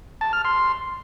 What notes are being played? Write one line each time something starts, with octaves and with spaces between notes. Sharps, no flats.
A5
F6
C6